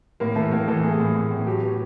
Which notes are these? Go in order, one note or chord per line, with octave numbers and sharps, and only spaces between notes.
A2 A#3 A#4
E3 A3 A4
A2 A#3 A#4
E3 A3 A4
A3 G#4
A2
A2
A2
F#3 G4
B3